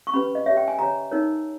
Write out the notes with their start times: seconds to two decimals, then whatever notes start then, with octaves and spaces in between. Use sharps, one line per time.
0.07 C#6
0.14 C#4 G4 B4 B5
0.35 D#5
0.46 G4 C#5 E5
0.57 G5
0.68 G#5
0.79 G4 C#5 A#5
1.11 D#4 A#4 C#5